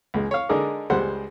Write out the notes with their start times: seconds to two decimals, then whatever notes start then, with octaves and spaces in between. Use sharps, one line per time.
0.14 C#2 G#3
0.31 C#5 F5
0.49 D3 G#3 D#4 G#4 A#4 D5
0.90 C#2 G3 G#3 C5 F#5